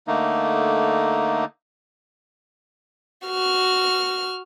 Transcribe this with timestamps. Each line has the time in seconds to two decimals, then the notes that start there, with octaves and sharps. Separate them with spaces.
0.07 D3 A3 A#3 D#4
3.27 F#4 F6